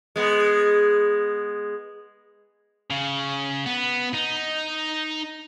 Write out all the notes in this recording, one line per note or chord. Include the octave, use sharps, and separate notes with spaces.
G#3 B3
C#3
B3
D#4